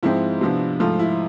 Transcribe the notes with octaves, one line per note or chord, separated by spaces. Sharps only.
G#2 F3 G#3 C4 E4
C3 F3 B3 D4
G#2 F3 A3 F4
E4